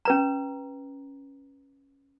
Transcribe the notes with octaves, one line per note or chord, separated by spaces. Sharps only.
C#4 B4 A#5